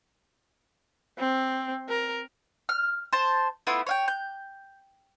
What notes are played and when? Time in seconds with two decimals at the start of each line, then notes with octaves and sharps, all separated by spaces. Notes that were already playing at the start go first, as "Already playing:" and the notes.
1.19 C4
1.89 A#4
2.69 F6
3.13 C5 A5
3.67 A3 B3 E4 F4
3.87 C#5 F5 G5
4.08 G6